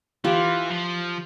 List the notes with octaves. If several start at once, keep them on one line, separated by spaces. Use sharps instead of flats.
E3 F4 G4
F3